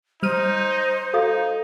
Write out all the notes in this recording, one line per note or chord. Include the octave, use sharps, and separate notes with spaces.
G3 D#4 C5 F6 D#7
D#4 A4 F5 D#6